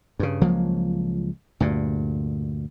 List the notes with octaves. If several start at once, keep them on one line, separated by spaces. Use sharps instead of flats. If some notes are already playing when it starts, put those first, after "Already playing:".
G2 C#3
C#2 F3 F#3 A#3
D2 G2 A#2